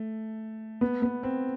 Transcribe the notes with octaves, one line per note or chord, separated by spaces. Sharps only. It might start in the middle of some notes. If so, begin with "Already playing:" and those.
Already playing: A3
B3
B3
C4